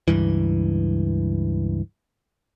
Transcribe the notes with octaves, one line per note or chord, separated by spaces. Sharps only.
C#2 G2 E3